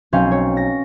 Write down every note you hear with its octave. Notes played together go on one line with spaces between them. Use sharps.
B1 C4 C#4 F5 G6
C#5
A#6